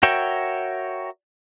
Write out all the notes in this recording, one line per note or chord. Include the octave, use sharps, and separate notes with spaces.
F#4 A#4 C#5 E5 G5